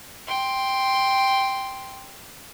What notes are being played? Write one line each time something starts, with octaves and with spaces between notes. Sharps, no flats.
G5 C6